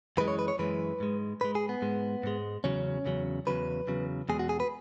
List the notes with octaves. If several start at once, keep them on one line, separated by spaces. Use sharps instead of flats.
F#2 E3 G#3 B4
C#5
B4
C#5
F#2 E3 G#3 B4
G#2 G#3
G#2 G#3 B4
G#4
B3
G#2 G#3
G#2 G#3
E2 C#3 F#3 C#4
E2 C#3 F#3
E2 C#3 F#3 B4
E2 C#3 F#3
E2 B2 G#3 G#4
F#4
G#4
B4